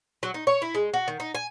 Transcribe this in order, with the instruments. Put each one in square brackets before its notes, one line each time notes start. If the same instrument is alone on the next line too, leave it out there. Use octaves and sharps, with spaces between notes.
[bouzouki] F#3
D#4
C#5
E4
G#3
F#4
D#3
D#4
G#5